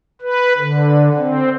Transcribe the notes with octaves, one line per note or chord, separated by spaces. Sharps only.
B4
D3
C4